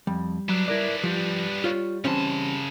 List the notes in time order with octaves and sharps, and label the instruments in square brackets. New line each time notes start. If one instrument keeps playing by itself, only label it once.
[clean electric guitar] F2 [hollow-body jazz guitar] G3
[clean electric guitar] F#3 [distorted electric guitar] B3 D4
[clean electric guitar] E4 A#4 D5
[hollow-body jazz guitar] F3 [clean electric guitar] G3
[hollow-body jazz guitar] F4 C#5
[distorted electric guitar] C#3 A5 [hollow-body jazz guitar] E3 C4 C#4